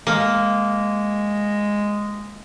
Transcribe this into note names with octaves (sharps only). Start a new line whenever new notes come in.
G#3 A#3